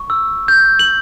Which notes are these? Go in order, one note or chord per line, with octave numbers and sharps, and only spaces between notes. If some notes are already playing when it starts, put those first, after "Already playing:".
Already playing: C#6
E6
G6
F#7